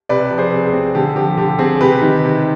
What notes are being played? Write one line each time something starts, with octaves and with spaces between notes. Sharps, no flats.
C3 B4 D5
F3
G#4 C5
C3
G#4
C4
D3 G4
F3 G4
D3 G4
C4 G#4
C3 G4 B4
D#3
C3